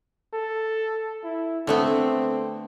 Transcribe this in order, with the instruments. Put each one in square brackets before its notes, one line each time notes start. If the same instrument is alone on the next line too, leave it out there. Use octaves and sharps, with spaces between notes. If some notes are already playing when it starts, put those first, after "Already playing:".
[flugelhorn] A4
E4
[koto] D3 A3 B3 [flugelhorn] C4